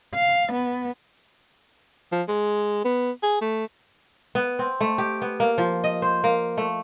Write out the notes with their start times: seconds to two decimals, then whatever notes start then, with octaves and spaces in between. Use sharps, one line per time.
0.15 F5
0.52 B3
2.12 F3
2.28 G#3
2.85 B3
3.23 G#4
3.41 A3
4.35 B3
4.59 C4
4.81 A3
4.98 G4
5.22 B3
5.40 A#3
5.58 F3
5.84 D#5
6.02 C5
6.24 A#3
6.58 A3